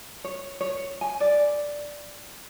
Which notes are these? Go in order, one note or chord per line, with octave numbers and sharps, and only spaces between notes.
C#5
C#5
G#5
D5